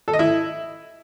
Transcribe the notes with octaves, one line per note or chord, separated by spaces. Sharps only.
A4
D#5
E4